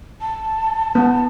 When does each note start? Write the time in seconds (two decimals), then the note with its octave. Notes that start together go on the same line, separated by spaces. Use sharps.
0.21 A5
0.95 B3